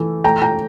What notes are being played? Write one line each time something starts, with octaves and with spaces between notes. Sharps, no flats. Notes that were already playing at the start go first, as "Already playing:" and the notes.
Already playing: E3 A3
A3 G5 A#5
G5 A#5